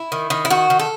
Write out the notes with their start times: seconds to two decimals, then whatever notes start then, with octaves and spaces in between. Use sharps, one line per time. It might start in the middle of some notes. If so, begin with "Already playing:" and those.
Already playing: E4
0.12 D#3
0.30 D#3
0.45 E4
0.50 D#3 F#4
0.70 D#3
0.80 A4